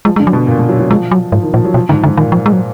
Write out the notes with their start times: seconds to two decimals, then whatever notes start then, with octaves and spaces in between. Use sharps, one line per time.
0.05 F3 G#3
0.16 G#3
0.20 D3
0.27 F#3
0.33 B2
0.47 A#2
0.59 B2
0.69 F#3
0.79 F#3
0.90 F3 G#3
1.11 F#3
1.32 G#2 F3
1.42 D#3
1.54 A#2 F3
1.65 F#3
1.74 B2 F3
1.89 G#2 D3
2.03 G#2 D3
2.17 A#2 D#3
2.32 F3
2.46 G#3
2.53 F#3